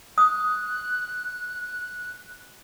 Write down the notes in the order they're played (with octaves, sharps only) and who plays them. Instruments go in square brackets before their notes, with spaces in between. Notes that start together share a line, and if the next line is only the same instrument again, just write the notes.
[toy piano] D#6 [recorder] F#6